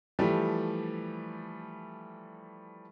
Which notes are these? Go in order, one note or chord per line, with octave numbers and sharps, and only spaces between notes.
E3 F3 G3 A3 G4